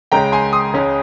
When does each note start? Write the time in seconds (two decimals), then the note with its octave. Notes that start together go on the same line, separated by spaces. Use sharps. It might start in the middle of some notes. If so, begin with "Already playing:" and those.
0.12 C#2 C#3 G#3 C#4 G5 A#5
0.32 G#5 C6
0.53 C6 D#6
0.74 C#2 C#3 G#3 C#4